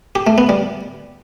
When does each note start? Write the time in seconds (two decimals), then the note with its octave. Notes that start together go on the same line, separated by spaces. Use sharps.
0.15 G4
0.27 A3
0.38 B3
0.49 G3